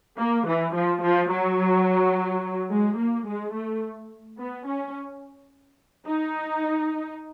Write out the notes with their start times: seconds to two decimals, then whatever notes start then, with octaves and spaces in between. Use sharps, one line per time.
0.18 A#3
0.47 E3
0.74 F3
1.02 F3
1.31 F#3
2.71 G#3
2.99 A#3
3.27 G#3
3.54 A3
4.39 B3
4.67 C#4
6.07 D#4